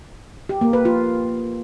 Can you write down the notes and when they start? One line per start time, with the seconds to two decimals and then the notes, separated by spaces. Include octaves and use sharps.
0.49 G4
0.61 A#3
0.73 B4
0.85 F4